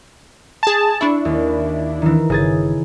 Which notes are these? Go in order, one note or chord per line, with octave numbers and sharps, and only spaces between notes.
G#4 A5
D4 E4 C#6
D#2
D#3 E3
G1 C#3 G#4 A6